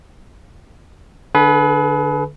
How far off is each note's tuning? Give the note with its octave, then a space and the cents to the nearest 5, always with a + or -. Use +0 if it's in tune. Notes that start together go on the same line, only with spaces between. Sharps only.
D3 +0 G#4 +45 B4 +0